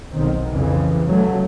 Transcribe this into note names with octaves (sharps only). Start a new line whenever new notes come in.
B1 D#3 C4
F2 C#3 E3
C#3 F#3 A3